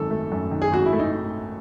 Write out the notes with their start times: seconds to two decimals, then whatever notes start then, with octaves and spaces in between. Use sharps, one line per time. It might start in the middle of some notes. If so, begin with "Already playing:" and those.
Already playing: G#1 F#2 D#3 A4
0.11 A3
0.32 F#2
0.51 D#3
0.62 G#4
0.72 G#1 F#4
0.86 E4
0.93 A3
0.99 D#4